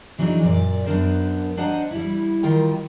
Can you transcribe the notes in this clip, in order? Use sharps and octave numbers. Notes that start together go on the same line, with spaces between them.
E3 F#3 D4 D#4 G#4
F#2 A#2 D5
F#2 B3 C4 D4 A#4 C5
D4 C5 D#5 F#5 A#5
G3 E4
D#3 G3 F4 A#4 G5